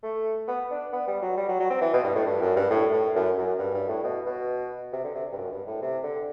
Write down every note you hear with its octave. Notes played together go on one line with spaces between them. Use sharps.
A3
B3
D4
B3
G3
F#3
G3
F#3
F#3
C4
E3
B2
G2
A2
G2
F#2
G2
A2
A2
F#2
F#2
G2
G2
A2
B2
B2
C3
D3
C3
G2
F#2
G2
A2
C3
D3